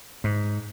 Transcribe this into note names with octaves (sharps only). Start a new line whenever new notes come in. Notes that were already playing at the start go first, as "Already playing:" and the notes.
G#2